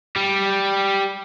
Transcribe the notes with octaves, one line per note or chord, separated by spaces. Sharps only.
G3